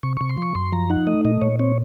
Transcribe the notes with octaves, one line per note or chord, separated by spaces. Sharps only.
C3 C#6
C3 C#6
C6
F3 C#6
F#2 C6
F3 A#5
D#4 F#5
A3 D#5
A#2 D#5
A#2 C#5
C4 C#5